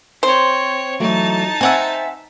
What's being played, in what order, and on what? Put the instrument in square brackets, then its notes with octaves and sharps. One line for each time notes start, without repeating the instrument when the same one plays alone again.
[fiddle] C4 C#5 [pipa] C5
[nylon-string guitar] E3 F#3 A3 [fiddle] D#4 A5
[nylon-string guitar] C4 [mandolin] E5 F#5 G#5